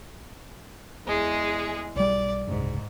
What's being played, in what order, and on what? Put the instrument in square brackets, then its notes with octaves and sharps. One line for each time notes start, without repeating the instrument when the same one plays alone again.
[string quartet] E2 G#3 G#4
[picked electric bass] B1 G3 [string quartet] D5
[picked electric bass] F#1 C2 [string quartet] G#2